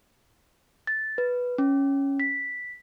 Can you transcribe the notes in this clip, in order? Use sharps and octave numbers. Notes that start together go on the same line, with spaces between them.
A6
B4
C#4
B6